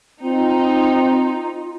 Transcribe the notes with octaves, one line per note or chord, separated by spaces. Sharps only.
C4 D#4 F4